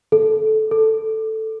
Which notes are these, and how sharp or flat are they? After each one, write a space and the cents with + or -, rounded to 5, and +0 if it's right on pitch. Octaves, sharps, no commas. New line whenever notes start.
A4 -15
A4 +0